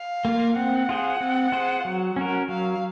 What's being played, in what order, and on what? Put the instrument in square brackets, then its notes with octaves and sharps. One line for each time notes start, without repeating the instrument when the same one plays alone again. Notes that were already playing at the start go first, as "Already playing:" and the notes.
Already playing: [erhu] F5
[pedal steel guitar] A#3 F4
[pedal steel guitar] C4 [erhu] F#5
[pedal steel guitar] F4 G#4 C5
C4
F4 G#4 C5
F#3
C#4 F#4 A#4
[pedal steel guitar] F#3 [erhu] F5